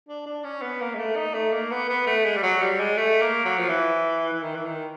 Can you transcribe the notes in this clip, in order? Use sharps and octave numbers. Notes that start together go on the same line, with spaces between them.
D4
D4
C#4
B3
A#3
G#3
A3
D#4
A3
A#3
B3
B3
A3
G#3
G3
F#3
G3
G#3
A3
A#3
F#3
F3
E3
E3
D#3
E3
D#3